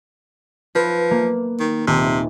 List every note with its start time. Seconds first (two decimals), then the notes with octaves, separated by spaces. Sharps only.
0.75 F3 B4
1.11 A#3
1.60 D#3
1.87 D#1 C3